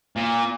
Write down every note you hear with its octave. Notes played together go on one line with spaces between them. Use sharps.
A#2